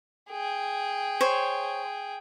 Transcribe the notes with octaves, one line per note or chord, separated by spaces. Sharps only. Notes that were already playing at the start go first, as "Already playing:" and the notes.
G#4 G5
C5 C#5